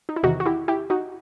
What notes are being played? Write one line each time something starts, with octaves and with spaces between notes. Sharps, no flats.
D#4
E4
E2 C3 D#3 D#4 F#4
F#4
E4 G4
E4 G4
D#4 F#4